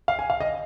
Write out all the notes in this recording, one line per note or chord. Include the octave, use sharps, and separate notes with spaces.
F5
G#5
F5
D#5